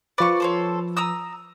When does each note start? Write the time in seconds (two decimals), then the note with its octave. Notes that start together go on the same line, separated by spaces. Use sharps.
0.18 F3 B4 D5 C#6
0.40 A4 C5 C#5
0.97 A#5 D#6 E6